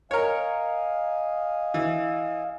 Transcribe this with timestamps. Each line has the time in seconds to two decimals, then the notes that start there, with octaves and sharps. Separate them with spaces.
0.11 A#4 C#5 D#5 F5 G#5
1.74 E3